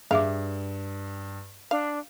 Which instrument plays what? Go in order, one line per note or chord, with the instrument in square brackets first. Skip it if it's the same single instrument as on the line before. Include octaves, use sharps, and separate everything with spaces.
[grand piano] G2 [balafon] G#4 E5 D6 [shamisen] F5
[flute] D4 [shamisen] F5